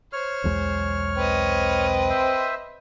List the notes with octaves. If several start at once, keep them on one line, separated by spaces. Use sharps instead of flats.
C5 C#5 F6
B1 E2 G#3
C4 B4 D#5
C5 E5